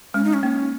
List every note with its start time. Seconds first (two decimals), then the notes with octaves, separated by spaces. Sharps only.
0.14 G#3 C#4
0.24 D#4
0.34 C#4
0.43 A#3